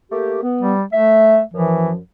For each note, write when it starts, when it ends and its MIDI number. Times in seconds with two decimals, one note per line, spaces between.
0.12 0.41 57
0.12 0.41 58
0.12 0.41 67
0.43 0.74 59
0.61 0.83 55
0.93 1.42 57
0.93 1.40 76
1.54 1.97 42
1.54 1.90 52
1.54 1.97 53